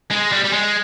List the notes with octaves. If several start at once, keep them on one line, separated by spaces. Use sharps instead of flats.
G#3
G3
G3
G#3